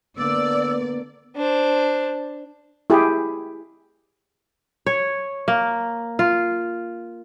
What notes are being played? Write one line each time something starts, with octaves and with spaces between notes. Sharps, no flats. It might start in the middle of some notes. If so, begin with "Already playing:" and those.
D3 A#3 B3 D5 E6
D4 C5
E4 G4 G#4
C#5
A#3
F4